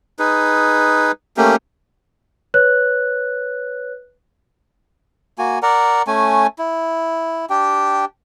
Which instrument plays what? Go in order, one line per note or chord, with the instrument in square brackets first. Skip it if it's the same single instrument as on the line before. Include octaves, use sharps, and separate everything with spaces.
[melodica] D#4 G#4 B4
A3 A#3 C#4 G4
[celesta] B4 C#5 F#6
[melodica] A#3 F#4 G#5
A#4 D5 F#5 A#5
A3 C#4 G#5
E4
D4 G4 G5